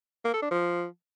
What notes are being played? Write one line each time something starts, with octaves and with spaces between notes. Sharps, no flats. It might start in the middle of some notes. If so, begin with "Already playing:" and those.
A#3
A4
D4
F3